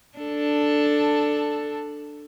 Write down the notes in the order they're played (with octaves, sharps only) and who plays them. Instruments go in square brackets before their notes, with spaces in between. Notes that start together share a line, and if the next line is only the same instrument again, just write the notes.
[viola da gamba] D4 A4